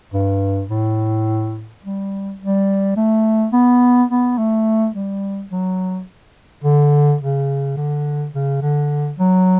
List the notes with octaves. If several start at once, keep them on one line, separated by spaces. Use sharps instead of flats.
G2
A2
G3
G3
A3
B3
B3
A3
G3
F#3
D3
C#3
D3
C#3
D3
F#3